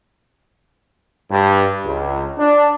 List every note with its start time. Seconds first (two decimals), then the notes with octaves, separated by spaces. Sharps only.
1.31 G2
1.85 C#2
2.38 D4